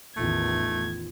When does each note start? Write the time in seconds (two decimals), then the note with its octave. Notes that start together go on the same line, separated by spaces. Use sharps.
0.17 A1 E2 D#3 A3 F4 G#6